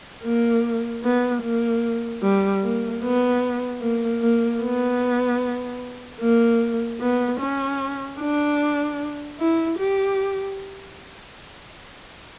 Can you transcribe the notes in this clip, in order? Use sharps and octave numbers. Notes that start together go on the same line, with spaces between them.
A#3
B3
A#3
G3
A#3
B3
A#3
A#3
B3
A#3
B3
C#4
D4
E4
G4